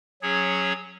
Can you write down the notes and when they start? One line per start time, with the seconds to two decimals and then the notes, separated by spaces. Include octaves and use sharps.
0.22 F#3 C#4 G#4 C#5